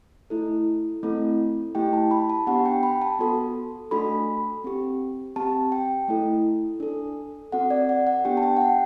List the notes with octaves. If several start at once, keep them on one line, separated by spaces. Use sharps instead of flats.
A3 E4 A4
A3 C4 E4 A4
A3 E4 G4 G5
A5
B5
A5
B3 D4 G4 F#5
G5
B5
A5
B3 F#4 A4
A3 D4 F#4 A4 B5
C4 G4
C4 G4 A5
G5
A3 E4 A4
D4 A4
C4 F#4 A4 F#5
D5
F#5
F#5
B3 D4 G4 G5
A5
G5
F#5
G5